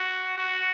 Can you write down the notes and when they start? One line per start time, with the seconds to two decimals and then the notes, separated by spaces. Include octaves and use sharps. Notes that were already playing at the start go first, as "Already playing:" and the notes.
Already playing: F#4
0.38 F#4